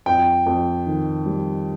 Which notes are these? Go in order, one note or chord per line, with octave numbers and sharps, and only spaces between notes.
F2 G5
F2
D#3
G3